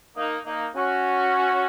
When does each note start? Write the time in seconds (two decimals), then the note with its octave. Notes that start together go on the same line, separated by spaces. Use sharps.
0.17 A#3 D#4
0.46 A#3 D#4
0.75 C#4 F#4